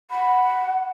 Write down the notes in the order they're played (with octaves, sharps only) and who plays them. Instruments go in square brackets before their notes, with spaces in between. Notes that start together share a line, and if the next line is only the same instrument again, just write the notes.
[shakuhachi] F#5 [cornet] B5